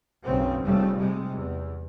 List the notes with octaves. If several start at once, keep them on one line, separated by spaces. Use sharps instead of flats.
F#1 B1 C#3 C4
F1 F2 C#3 G3 A3
C3 G3 G#3
E2